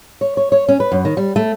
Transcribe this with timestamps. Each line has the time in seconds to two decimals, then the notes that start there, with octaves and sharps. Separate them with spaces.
0.21 C#5
0.37 C#5
0.52 C#5
0.69 C#4
0.80 B4
0.92 F#2
1.05 D#3
1.17 G3
1.36 A3